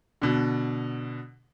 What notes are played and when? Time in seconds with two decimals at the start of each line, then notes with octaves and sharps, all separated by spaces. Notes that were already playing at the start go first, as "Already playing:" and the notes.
0.22 B2 D3